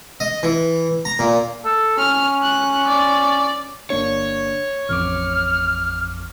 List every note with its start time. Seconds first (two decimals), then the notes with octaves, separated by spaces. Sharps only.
0.20 D#5
0.43 E3
1.05 A#5
1.19 A#2
1.65 A4
1.98 C#4 F6
2.42 F#6
2.88 D5
3.90 G1 A#3 D4 C#5
4.89 A1 F2 D6 F6